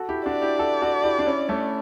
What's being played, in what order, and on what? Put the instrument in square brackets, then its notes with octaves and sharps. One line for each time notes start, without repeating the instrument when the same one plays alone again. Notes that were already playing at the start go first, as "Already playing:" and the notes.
Already playing: [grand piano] F#4 A4
E4 G4
[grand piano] D4 F#4 [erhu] D5
[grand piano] E4 G4
F#4 A4
F#4 A4
E4 G4
D4
C#4 E4
A3 C#4